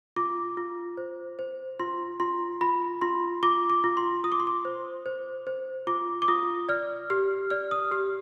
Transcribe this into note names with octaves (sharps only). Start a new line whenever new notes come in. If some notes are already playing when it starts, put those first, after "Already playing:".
F4 D6
F4
C5
C5
F4 C6
F4 C6
F4 B5
F4 C6
F4 D6
D6
F4
C6
F4 D#6
D6
C6
D6
C5
C5
C5
F4 D6
D6
F4 D#6
D5 F6
G4 F6
D5 F6
D#6
G4 F6